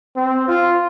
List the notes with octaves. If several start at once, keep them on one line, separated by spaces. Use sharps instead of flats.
C4
F4